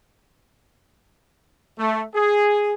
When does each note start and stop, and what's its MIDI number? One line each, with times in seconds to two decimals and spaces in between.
1.78 2.03 57
2.14 2.74 68